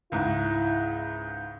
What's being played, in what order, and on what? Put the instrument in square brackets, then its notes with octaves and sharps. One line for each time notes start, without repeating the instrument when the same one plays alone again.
[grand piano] C#2 G#2 [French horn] E4